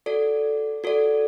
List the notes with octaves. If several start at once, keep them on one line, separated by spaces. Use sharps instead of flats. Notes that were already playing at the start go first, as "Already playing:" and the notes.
F#4 A4 D5
F#4 A4 D5